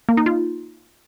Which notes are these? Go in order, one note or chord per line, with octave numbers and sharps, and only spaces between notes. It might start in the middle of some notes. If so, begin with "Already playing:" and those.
A#3
D#4
F4